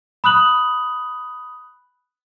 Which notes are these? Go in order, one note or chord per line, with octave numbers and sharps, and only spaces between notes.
B5 D#6 F#6 F#7